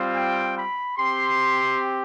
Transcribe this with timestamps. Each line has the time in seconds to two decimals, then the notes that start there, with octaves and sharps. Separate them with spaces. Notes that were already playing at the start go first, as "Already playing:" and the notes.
Already playing: G3 C4 F4
0.16 G5
0.57 B5
0.98 C4 G4 C6